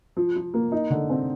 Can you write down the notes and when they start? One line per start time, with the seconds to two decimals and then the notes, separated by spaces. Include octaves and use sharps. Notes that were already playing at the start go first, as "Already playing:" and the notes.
0.17 F3
0.36 F3
0.54 A#3
0.72 D#4
0.90 D3
1.10 C4